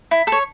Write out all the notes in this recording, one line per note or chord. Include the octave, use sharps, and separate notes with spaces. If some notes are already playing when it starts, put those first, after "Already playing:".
E4
A4
C#5